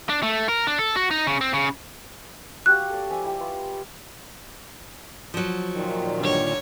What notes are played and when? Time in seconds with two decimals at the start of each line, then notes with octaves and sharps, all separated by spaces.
0.09 D4
0.23 A3
0.49 A#4
0.67 D4
0.79 A4
0.96 F#4
1.11 D#4
1.27 C#3
1.41 C4
1.54 C#3
2.66 F#4 G4 F5 F#6
2.90 A4 D5
3.11 F3 E5 G#5
3.23 E4 G4
3.40 F4 B4 C#5
5.34 F3 F#3
5.74 A#2 D#3
6.18 G2 D3 C#5